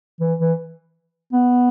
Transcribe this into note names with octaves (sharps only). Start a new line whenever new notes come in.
E3
E3
B3